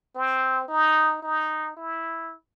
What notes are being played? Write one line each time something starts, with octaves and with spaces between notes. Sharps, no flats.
C4
D#4
D#4
E4